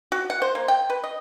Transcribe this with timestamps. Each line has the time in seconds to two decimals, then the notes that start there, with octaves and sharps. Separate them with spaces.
0.12 F#4
0.30 F#5
0.42 C5
0.55 A#3
0.68 G5
0.90 B4
1.04 D#5